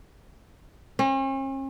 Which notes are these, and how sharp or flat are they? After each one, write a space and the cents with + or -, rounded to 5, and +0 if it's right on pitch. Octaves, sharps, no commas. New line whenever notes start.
C#4 -45